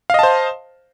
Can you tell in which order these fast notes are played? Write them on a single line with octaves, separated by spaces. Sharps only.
F5 D#5 A5 C5